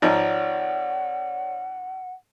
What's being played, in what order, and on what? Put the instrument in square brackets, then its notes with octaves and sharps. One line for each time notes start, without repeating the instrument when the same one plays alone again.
[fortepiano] G#1 F3 [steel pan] D#4 [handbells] C#5 D5 [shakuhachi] F#5